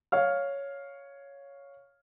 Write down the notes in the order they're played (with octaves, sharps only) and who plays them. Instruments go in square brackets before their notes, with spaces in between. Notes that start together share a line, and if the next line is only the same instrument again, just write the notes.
[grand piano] C#5 F5 F6